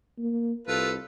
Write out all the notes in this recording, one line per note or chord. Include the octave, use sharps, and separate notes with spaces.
A#3
C2 F4 A4 B4